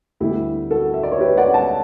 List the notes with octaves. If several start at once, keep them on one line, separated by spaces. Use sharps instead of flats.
D2 D3 G3 B3 E4 G4
F#4 A4
E5
D5
C#5
G4 B4
D5 F#5
F#5 A5